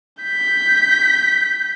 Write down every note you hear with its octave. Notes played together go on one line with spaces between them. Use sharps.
G6 B6